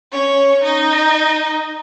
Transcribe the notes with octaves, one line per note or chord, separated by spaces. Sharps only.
C#4 C#5
D#4 D#5